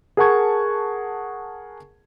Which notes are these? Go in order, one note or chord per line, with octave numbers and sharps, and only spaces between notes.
G#4 A#4 F#5 A5 C#6 G#6